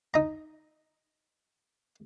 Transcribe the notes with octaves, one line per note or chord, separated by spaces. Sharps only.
D#4 A#5